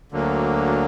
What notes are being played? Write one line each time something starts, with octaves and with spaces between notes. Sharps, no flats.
D2 D3 F#3 A#3